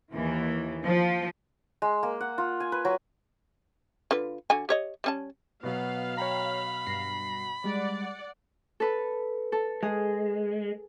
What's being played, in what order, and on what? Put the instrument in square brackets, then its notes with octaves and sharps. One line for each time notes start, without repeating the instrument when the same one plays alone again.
[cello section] D#2 E3
F3
[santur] G#3
A#3
F#5
F4
G#5
B4
F#3
[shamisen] D3 F4 B4
D3 F#4 G#5
G4 C#5 D#5
G3 C#4 A5
[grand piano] B2 F#3 [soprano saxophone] B3 [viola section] F5
[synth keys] C#5 G5 A#5 [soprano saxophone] B5
[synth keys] G2 A#6 C7
[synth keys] G3 G#3 [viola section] D5 F#5
[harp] A4 B4
A4
[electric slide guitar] G#3 [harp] G#4